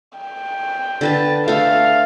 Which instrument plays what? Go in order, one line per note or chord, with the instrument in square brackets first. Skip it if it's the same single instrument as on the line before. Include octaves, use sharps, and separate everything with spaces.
[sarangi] G5
[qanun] D3 B4 A5
[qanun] A3 A4 [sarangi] F5